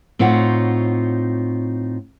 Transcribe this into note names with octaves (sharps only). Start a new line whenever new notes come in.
A2 C4 D#4 F4 C#5 F#5